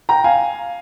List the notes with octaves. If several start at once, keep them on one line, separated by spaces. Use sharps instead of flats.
G5 A#5
F5 G#5